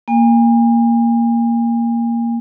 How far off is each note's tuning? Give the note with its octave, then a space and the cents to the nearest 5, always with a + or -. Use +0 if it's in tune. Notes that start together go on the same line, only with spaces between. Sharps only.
A#3 +0 G#5 -40